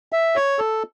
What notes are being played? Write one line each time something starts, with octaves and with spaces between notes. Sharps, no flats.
E5
C#5
A4